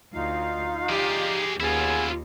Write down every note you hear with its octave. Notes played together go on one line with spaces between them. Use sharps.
D2 D#4 F4 F5
G4 G#4 D5
D#2 B3 C#4 E4 F4 G#4